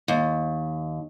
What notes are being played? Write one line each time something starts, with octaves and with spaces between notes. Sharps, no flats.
D#2